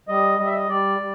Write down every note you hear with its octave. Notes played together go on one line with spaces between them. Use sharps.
G3 D#5
G3 D#5
E5
D#5
G3 D5
G3